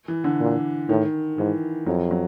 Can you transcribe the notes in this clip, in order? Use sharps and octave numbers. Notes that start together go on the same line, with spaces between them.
E3
D3
A#2
A2 D#3
G#2 E3
F2 F#3
F#3